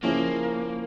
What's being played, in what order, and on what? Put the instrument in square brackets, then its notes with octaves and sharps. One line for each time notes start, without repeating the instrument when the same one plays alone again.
[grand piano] C#3 F3 C#4 E4 [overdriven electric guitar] A#3